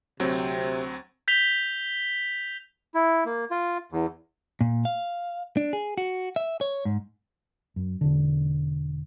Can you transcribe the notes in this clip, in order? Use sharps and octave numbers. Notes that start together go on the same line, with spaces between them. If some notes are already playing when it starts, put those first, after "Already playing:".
D2 C3 F#3 C4
G6 B6 F7 G7
E4
A#3
F4
E2
A#2
F5
D4
G#4
F#4
E5
C#5
G#2
F#2
E1 D3